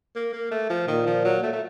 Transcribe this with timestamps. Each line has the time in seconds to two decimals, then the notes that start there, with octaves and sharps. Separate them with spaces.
0.16 A#3
0.33 A#3
0.51 A3
0.70 F3
0.88 A#2 D#3
1.06 F3
1.25 F#3
1.43 A3
1.53 A3